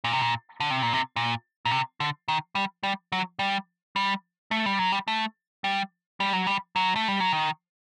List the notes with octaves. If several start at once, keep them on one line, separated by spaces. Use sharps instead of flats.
A#2
C3
A#2
D3
C3
A#2
C3
A#2
A#2
C3
D3
D#3
G3
G3
F#3
G3
G3
A3
G3
F#3
G3
A3
G3
G3
F#3
G3
F#3
A3
G3
F#3
D#3